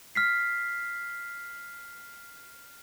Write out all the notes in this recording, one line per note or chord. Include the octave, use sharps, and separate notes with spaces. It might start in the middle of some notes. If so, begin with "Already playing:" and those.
F6 B6 C7